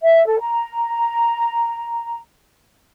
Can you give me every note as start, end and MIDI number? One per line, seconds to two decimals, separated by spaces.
0.01 0.25 76
0.26 0.40 69
0.41 2.18 82